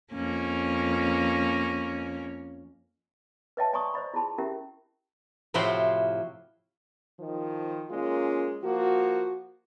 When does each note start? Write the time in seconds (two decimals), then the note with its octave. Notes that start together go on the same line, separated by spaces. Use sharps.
0.13 F2 A#3 C#4
3.57 B4 C#5 D#5 E5 G5 A5
3.73 D5 G#5 A#5 C6 C#6 D#6
3.94 C5 D5 D#5 B5
4.14 E4 F4 G#4 A5 B5 C6
4.38 C#4 E4 G4 A#4 E5
5.54 A2 C3 F3 E4 F#4 C5
7.20 D#3 F3
7.90 G#3 A#3 C#4 F4
8.63 F3 A#3 F#4